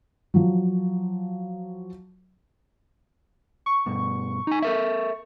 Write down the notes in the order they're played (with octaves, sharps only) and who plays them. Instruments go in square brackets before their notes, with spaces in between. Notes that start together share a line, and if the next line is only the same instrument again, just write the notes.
[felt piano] F3 F#3
[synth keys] C#6
[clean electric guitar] G2 B2
D#4 G#5
A4 A#4 E5